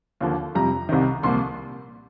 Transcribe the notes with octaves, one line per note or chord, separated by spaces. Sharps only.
D#2 D3 F3 A#3
F2 C3 G3 A#5
C2 C3 D#3
C2 A#2 F3 A#3 C6